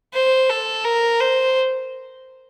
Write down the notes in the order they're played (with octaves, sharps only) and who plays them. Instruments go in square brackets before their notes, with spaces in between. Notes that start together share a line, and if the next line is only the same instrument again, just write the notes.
[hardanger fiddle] C5
A4
A#4
C5